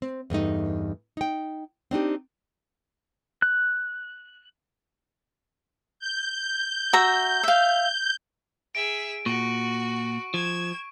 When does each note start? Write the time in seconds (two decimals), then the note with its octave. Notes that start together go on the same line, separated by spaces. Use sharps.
0.02 C4
0.30 E2 G2 A3 D#4
1.17 D#4 G5
1.91 C4 D4 D#4 G4
3.42 F#6
6.00 G6
6.93 F#4 E5 A#5
7.43 E5 F5
8.75 G#4 E5 D7
9.26 A#2 F#4 C#6
10.34 F3 G#6 E7